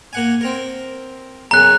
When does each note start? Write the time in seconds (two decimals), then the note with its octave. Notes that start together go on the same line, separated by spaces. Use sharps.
0.13 A#3 F#5 G#5
0.41 C4 A#4
1.51 B1 F#2 C#3 A#5 F#6